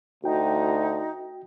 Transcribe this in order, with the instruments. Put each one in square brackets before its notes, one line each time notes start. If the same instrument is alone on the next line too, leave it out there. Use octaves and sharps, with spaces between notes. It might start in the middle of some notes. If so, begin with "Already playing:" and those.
[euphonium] D2 [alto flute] D#4 [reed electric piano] F#4 G5